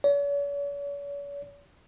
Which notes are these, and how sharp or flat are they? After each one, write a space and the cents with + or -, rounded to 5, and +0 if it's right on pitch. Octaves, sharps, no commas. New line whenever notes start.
C#5 +45